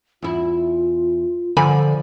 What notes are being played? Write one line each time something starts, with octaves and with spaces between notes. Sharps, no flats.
E2 E4 F4
D3 F3 D5 G#5 B5